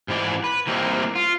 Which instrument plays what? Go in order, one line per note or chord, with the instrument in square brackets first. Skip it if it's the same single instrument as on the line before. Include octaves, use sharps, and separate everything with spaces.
[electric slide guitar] G#2 E3 G#3 D5
B4
E3 G3 A#3 C4 D#4
F4